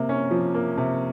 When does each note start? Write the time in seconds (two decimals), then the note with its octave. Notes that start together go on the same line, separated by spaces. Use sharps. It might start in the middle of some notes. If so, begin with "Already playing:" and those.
Already playing: C3 A#3
0.09 C#4
0.31 F3
0.54 A#3
0.77 C3